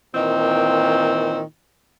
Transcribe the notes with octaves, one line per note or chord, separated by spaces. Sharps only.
A#2 D#3 E3 C4